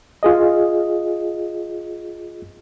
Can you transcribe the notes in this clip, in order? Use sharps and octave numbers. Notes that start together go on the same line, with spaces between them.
F4 G#4 D#5